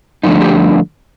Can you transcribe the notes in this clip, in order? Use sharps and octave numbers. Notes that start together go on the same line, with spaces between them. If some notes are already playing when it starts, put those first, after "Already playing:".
G2 D3 F3 A3 D4 D#4
G4